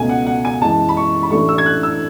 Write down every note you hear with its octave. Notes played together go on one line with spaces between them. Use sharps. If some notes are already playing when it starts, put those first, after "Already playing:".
Already playing: C#2 B2 A3 G#5
F#5
F#5
G#5
F#2 E3 G#3 A5
B5
C#6
B5
A1 A2 E3 A3 D4 C#6
E6
G#6
F#6
E6